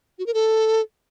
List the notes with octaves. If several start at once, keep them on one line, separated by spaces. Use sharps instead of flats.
F#4
A#4
A4